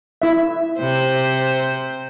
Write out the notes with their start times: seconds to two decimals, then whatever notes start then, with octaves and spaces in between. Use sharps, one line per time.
0.22 E4 E5
0.78 C3 C5